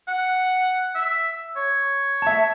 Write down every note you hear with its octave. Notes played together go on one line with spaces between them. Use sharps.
F#5
E5
C#5
E5 A5